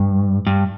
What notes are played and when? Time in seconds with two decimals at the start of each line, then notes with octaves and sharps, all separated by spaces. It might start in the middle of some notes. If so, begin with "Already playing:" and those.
Already playing: G2
0.47 G2